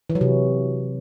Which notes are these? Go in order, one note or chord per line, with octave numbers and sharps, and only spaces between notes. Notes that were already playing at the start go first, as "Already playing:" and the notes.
E3
F#3
C3